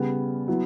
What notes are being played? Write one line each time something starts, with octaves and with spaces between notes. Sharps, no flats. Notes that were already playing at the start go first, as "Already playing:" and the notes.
Already playing: C#3 G3 B3
F#3 B3 E4